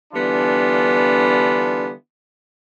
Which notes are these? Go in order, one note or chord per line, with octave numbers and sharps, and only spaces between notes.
D3 E3 G3 B3 D4 F4